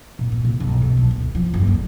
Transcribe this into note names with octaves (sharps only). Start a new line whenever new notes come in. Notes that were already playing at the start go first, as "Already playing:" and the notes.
A#2
A#3
C3
B1
B2
B1
D2
F3
F#1
D3